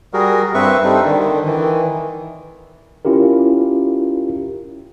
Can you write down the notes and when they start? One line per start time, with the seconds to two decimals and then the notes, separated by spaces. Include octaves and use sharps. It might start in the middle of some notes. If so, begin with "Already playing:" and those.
0.13 G3 F#4 G#4 A#4
0.54 G2 C4 B4 E5 C#6
0.84 G3 C4 D#4 A4
1.04 D3 D#3
1.46 D#3 E3
3.05 C#4 E4 F4 G4 A#4